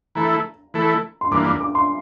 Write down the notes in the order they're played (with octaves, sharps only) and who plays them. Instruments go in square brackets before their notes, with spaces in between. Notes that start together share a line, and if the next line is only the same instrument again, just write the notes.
[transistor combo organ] E3 A3 E4 A4 [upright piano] A#5
[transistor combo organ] E3 A3 E4 A4
[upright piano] C6
[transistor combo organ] G2 E3 A#3 [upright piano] D6
[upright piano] D6
D6
C6